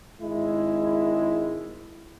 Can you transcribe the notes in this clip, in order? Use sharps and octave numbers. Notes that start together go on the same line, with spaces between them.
G#1 G#3 E4